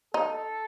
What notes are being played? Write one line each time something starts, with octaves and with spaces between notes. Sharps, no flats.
D#4 A4